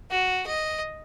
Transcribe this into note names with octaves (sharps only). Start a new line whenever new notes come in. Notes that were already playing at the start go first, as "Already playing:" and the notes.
F#4
D#5